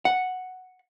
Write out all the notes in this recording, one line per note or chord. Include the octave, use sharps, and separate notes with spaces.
F#5